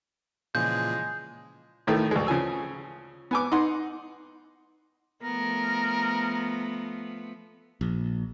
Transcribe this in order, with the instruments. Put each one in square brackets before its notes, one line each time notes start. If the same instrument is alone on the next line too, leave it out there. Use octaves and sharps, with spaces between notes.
[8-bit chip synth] A#2 [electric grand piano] C#3 E3 F3 [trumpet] G#3 [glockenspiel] G6
[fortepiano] A2 D#3 A3
D2 G#3
C#3 F3 G#5 E6
B3 G#5 D6
D#4 F#5 C6
[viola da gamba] F3 A3 B3 [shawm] A#4
[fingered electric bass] A#1